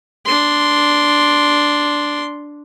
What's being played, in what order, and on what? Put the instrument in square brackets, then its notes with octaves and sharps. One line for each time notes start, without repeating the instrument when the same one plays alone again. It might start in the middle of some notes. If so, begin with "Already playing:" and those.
[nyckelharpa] D4 C6